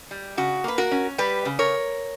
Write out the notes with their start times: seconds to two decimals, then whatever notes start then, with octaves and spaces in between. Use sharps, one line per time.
0.11 G3
0.37 C#3 F#4
0.64 A#3 B4
0.78 F#4 A#4
0.91 C#4
1.18 G3 G4 B4
1.45 C#3
1.59 A#4 C#5